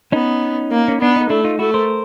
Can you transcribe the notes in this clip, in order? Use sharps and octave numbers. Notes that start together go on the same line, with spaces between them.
B3 C#4 D#4
A#3
C#4
B3 D4
D#4
A3 D4 E4
D#4 F4
A3 E4 F#4
A#4 C5